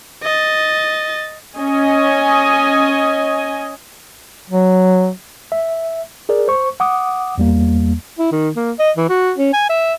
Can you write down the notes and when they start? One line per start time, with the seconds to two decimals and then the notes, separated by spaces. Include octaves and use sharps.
0.23 D#5 A6
1.56 C#4 D#5 G#5
4.50 F#3
5.52 E5
6.29 G#4 A#4 D5
6.48 C5 C#6
6.80 F#5 D6 D#6
7.38 E2 G3 A#3
8.19 E4
8.32 D#3
8.56 A#3
8.79 D#5
8.97 E3
9.09 F#4
9.38 C#4
9.53 G#5
9.70 E5